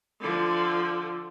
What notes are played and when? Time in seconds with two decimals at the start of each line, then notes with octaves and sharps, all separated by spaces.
0.20 D3 F3